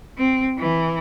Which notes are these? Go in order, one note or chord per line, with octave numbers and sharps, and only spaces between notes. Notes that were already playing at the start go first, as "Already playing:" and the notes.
C4
E3